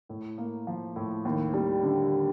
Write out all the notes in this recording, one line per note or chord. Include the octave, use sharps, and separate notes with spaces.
A2
A#3
F3
A2
D#2
G3
D3